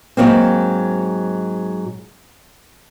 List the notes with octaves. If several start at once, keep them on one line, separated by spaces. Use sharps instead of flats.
G#2 F#3 A#3 C4